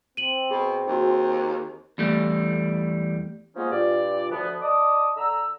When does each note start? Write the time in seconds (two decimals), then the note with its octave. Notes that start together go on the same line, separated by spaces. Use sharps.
0.17 C4 D#7 F#7
0.51 B2 G#4
0.88 D#2 F#4 G#4
1.98 E2 G3 A3
3.56 F3 G#3 A#3 B3 C#4 D#4
3.71 G2 A#2 D5
4.31 D2 F3 B3
4.62 D5 D#5 A5 D6 D#6
5.16 D3 A#5 E6